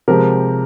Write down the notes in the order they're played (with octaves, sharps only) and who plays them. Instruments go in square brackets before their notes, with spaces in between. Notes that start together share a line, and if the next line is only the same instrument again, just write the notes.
[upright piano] C3 F3 G#3 G4 A#4